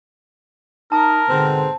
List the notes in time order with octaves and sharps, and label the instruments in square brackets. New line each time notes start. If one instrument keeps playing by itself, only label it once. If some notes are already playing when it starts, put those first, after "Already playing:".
[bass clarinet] D#4 [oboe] A#4 [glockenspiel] A5
[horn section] G#2 B2 C4 [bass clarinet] D3